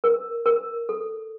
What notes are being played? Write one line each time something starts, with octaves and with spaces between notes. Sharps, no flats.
A#4
A#4
A4